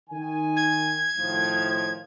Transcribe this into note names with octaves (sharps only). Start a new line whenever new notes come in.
D#3 G#5
G#6
A2 D#3 F3